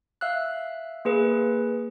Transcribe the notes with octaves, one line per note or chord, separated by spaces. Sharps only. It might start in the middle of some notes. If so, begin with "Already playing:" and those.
E5 F5 E6 F#6
A#3 G#4 B4